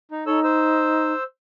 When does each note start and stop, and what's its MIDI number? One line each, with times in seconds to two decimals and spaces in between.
0.11 0.24 63
0.26 1.12 63
0.26 0.40 69
0.26 0.40 73
0.26 0.40 88
0.44 1.23 72
0.44 1.23 88